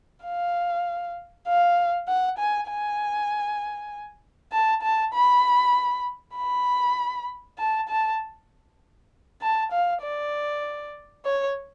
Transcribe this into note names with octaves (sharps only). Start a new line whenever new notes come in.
F5
F5
F#5
G#5
G#5
A5
A5
B5
B5
A5
A5
A5
F5
D5
C#5